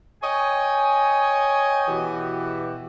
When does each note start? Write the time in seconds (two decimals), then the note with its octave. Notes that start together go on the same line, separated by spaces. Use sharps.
0.22 C#5 D#5 G5 G#5
1.88 B2 E3 F#4 G4